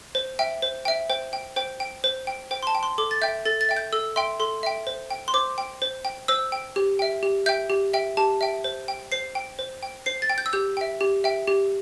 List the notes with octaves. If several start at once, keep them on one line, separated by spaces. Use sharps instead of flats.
C5
E5 G5
C5
E5 G5
C5 G5
G5
C5 G5
G5
C5
G5
C5 G5
C6
A5
G5
C6
A4 D6
A6
E5 G5 G6
A4 A6
A6
E5 G5
G6
A4 E6
E5 G5 C6
A4 C6
E5 G5
C5
G5
C6
C5 D6
G5
C5
G5
C5 E6
G5
G4
E5 G5
G4
E5 G5 G6
G4
E5 G5
G4 A5
E5 G5
C5
G5
C5 C7
G5
C5
G5
C5 C7
A6
G5
G6
E6
G4 G6
E5 G5
G4
E5 G5
G4